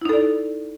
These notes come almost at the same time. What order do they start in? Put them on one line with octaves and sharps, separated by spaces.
E4 D#4 A4 D5